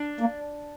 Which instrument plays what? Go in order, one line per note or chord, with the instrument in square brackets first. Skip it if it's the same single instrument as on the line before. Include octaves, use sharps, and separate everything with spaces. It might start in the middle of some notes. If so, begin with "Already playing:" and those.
Already playing: [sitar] D4
[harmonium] A#3